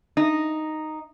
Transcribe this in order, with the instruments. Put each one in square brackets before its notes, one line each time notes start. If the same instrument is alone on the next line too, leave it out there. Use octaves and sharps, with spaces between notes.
[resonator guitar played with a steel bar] D#4